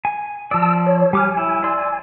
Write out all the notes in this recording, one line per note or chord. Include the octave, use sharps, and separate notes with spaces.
G#5
F3 D5 A5 E6
C#5
G3 G#5 D6 F6
E4
D5 C6 E6